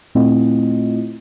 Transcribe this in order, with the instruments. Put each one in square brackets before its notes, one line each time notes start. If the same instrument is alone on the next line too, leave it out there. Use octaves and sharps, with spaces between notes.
[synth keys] A#2 A3 C4 E4 F4 D#5